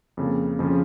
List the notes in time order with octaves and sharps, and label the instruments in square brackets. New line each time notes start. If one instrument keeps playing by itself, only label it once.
[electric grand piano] F2 C#3 A#3
F2 C#3 F3 C#4 F4